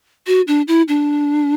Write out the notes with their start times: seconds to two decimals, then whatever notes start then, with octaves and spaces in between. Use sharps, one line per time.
0.27 F#4
0.47 D4
0.68 E4
0.88 D4